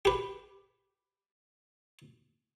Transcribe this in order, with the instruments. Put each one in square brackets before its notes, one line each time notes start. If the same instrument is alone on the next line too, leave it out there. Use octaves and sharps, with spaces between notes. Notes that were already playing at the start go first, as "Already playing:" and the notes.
[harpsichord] G4 B4